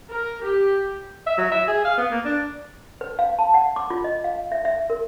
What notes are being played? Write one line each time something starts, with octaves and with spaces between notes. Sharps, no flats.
A#4
G4
E5
F#3
E5
G#4
F5
B3
A#3
D4
B4
F5
A5
F#5
D6
F4
D#5
F5
E5
E5
A#4